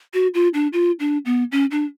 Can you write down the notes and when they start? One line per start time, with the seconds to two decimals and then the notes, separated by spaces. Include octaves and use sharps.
0.14 F#4
0.34 F4
0.54 D4
0.73 F4
1.00 D4
1.26 B3
1.52 C#4
1.71 D4